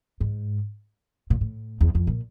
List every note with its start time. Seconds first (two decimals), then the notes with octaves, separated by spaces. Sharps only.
0.21 G#2
1.30 A#2
1.41 A2
1.81 E2
1.95 F2
2.07 A#2